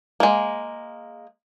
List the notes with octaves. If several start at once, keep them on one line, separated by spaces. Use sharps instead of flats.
G#3 A#3